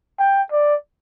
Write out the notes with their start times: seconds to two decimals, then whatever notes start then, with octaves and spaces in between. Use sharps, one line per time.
0.19 G5
0.52 D5